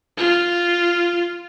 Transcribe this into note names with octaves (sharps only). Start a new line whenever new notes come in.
F4